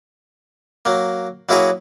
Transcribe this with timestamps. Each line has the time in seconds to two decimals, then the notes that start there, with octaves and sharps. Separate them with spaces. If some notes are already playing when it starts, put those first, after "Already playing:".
0.85 F#3 A#3
1.49 F#3 A#3 E4 F#4 G#4 C#5